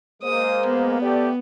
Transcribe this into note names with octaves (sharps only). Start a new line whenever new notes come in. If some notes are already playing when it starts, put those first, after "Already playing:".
G#3 A#3 C5 D#6
B3
A3 G4 D5